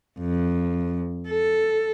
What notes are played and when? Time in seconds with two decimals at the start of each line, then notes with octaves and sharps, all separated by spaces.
0.19 F2
1.29 A4